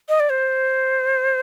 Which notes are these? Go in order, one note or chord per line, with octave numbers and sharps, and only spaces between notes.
D#5
D5
C5